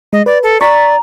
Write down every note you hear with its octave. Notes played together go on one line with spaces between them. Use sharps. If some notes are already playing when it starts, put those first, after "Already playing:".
G#3 D#5
B4 D5
A4
D5 A#5 C#6 A6 B6